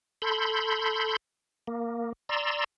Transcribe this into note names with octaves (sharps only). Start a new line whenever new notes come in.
A4 B5 C6 G6
A#3
D5 A#5 C6 E6